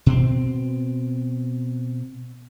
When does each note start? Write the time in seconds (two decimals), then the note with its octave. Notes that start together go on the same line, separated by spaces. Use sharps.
0.06 B2 C4